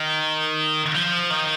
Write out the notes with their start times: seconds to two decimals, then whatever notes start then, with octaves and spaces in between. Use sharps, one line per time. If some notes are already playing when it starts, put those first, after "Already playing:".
Already playing: D#3
0.95 F3
1.30 D#3